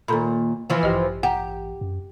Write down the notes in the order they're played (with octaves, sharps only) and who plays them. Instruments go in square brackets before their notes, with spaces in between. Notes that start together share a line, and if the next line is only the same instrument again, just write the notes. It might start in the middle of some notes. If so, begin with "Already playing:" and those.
[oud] D#2 A#2 [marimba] A4 A#5 B5
[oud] E3 F3
[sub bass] A1 [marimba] G2 G4 D#5
[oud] G4 [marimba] F#5 A#5
[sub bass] F#2